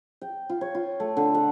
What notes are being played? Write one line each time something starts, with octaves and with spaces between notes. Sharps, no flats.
G5
F4
C#5
F4
A3
D3
F#5